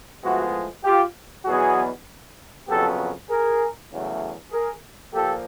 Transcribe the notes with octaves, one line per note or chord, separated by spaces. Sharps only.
A2 F3 G#3 B3 E4 F#4
F4 G4
E2 B2 F#3 B3 F#4 G#4
F2 C#3 F#3 B3 G4 A4
G#4 A#4
E2 C#3 F#3 A3
G#4 A#4
A#2 F3 A#3 G4 A4